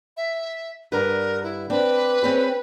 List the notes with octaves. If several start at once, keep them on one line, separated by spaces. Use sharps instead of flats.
E5
G2 D3 A#4 B4
E4
C4 D4 B4
C4 C#4 G#4